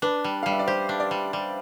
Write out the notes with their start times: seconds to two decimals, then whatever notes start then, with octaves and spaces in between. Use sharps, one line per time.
0.02 D4 B4
0.24 G3
0.43 F5
0.46 G3
0.52 E5
0.59 D5
0.67 G4 C5
0.89 D4
1.00 D5
1.11 G3
1.33 G3